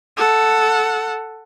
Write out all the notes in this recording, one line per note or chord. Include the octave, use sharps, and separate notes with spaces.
A4 F#5